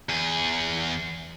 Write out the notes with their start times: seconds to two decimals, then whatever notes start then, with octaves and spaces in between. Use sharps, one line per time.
0.09 E2 G#4